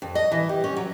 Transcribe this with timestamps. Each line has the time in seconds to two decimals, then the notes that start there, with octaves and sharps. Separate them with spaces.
0.02 F2
0.15 D#5
0.31 E3
0.49 G4
0.64 C#4
0.76 F#3